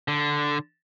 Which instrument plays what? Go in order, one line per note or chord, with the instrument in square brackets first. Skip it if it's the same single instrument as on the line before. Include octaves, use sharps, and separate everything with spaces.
[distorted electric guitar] D3